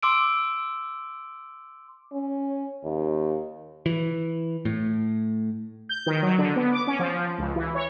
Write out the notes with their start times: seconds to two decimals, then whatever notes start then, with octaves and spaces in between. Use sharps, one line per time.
0.03 C6 D6 E6 D7
2.13 C#4
2.83 D#2
3.86 E3
4.65 A2
5.89 G6
6.06 D#3
6.22 F#3
6.38 D3
6.56 B3
6.72 D6
6.87 C#4
6.99 F3
7.38 C#2
7.56 E3
7.75 C#5